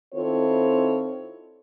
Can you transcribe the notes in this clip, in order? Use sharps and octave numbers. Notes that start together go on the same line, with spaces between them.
D#3 C4 E4 F4 A4 C#5